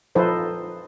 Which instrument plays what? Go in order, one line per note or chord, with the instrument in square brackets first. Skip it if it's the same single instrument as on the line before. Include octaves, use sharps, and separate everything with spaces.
[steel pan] F3 D#4 A4 B4 C5